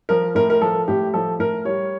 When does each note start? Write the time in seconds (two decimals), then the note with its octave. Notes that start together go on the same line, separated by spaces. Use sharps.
0.09 F3 A#4
0.35 A2 A#4
0.50 A#4
0.62 F3 A4
0.88 A2 G4
1.14 F3 A4
1.39 A2 A#4
1.65 G3 C#5